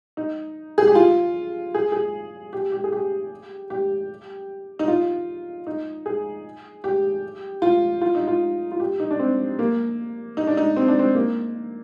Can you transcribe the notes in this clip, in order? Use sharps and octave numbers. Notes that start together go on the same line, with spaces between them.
D#4
G#4
G4
F4
G#4
G#4
G4
G4
G#4
G4
G4
D#4
F4
D#4
G#4
G4
F4
F4
D#4
F4
F4
G4
D#4
D4
C4
A#3
D#4
D4
D#4
C4
D4
C4
A#3